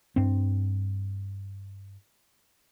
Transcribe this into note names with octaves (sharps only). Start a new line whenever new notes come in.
G2 C4